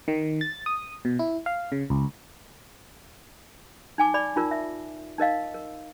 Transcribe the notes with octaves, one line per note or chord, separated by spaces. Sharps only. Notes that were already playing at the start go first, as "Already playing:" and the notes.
D#3
A6
D#6
B2
E4
F5
C#3
C#2
D#4 G#5 D6
D5 B5 D6
D#4 F4 A#4
E5
D#4 A#4 D#5 F5
A#4